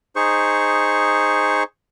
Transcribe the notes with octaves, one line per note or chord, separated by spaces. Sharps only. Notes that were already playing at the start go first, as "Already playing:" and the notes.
D#4 G#4 C5 C#6